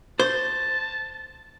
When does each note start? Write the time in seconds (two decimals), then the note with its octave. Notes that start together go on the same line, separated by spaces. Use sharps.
0.19 C5 A5